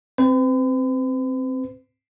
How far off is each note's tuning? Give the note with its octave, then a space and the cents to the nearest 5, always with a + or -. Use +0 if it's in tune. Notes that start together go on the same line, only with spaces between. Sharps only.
C4 +0 B4 +45